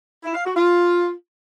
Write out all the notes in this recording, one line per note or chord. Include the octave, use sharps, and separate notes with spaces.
E4
F5
F#4
F4